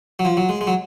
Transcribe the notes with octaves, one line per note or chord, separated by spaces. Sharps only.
F#3
F3
F#3
G#3
G#3
F#3